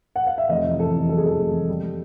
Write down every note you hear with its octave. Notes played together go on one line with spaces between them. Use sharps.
F#5
F5
E5
F1 D#5
E2
E2 A4
E2
F#3 A4
G#4
E2 A4
F1
F#3
G3
G3